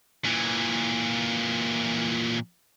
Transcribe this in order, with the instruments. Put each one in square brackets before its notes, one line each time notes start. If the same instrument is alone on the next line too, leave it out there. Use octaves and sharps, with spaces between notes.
[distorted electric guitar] A#2 E3